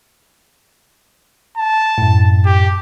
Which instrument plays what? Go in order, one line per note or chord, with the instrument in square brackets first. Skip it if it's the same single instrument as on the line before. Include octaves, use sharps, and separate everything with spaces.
[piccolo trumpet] A5
[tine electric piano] F#2 A2
[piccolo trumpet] G4